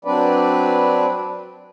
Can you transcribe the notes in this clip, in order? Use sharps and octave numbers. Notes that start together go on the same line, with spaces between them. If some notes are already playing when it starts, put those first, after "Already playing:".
F#3 C4 D4 B4 D5